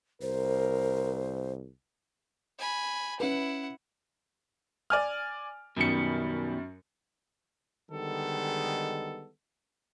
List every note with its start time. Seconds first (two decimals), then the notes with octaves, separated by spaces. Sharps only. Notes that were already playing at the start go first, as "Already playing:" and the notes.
0.22 C2 A#4 C5
2.59 G#5 B5
3.20 C#4 E4 B4 F#5
4.90 D5 G#5 F6
5.77 F#2 B2 D#3 G3 C#7
7.91 D3 D#3 G3 G#3 B3 A4